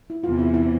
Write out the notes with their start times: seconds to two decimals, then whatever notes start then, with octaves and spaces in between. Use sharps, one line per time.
0.10 E4
0.24 E2 C3 E3 F4
0.39 E4
0.54 E4